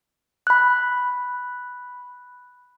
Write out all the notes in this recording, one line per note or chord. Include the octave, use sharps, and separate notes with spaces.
B5 F#6